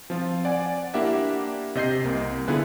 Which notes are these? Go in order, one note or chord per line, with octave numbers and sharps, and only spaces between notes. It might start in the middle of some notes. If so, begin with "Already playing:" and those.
F3 C4 F4
D5 F#5 G#5
A#3 D4 E4 G4 E5 F#5
C3 D#5 G6 C7
C2 A#3
D3 B3 E4 F4 G#4 B4